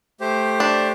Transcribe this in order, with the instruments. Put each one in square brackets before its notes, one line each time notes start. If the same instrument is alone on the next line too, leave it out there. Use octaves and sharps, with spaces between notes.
[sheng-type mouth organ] A3 G4 C5
[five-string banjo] D4